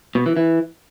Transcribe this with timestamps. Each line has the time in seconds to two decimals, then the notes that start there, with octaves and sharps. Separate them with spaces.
0.15 B2
0.26 E3
0.37 E3